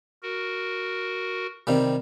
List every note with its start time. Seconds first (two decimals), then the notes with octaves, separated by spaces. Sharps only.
0.23 F#4 A#4
1.67 C3 D#3 G3